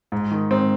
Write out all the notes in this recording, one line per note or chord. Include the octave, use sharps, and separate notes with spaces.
G#2
D#3
G#2 C4